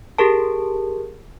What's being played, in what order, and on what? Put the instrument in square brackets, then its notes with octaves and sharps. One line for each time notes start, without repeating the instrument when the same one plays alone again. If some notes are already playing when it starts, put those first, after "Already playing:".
[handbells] G4 G#4 A#4 A5